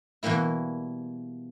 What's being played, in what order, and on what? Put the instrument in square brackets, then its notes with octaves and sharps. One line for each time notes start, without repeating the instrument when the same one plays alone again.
[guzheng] B2 E3 G3 A#3 E4